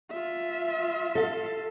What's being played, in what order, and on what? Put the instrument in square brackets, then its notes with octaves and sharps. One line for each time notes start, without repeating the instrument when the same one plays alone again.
[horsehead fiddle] F4 E5
[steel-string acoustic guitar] A4 F5